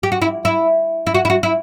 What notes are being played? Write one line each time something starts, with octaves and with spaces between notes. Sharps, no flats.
G4
F#4
E4
E4
E4
F#4
E4
F#4
E4